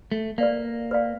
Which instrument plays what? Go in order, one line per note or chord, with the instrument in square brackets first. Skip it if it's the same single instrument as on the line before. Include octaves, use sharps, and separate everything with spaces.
[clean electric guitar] A3
[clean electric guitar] A#3 [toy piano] B4 D5 F5
[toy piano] B4 D5 F5